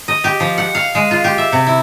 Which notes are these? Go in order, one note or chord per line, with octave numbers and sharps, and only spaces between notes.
D#5
G4
F3
F#5
F5
G#3
F4
G4
E5
C3
E4